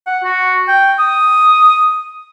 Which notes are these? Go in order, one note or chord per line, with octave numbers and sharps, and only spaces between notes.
F#5
F#4
G5
D#6